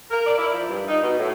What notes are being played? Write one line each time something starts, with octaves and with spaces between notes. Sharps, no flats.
A#4
D5
E4
F3
G2
D#4
B2
A2